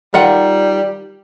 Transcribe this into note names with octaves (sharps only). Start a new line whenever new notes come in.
D#3 G3 F4 F#5